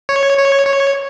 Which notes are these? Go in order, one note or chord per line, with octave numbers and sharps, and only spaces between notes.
C#5
C#5
C#5